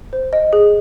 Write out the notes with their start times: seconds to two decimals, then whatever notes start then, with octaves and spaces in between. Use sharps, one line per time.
0.13 C5
0.33 D#5
0.53 G#4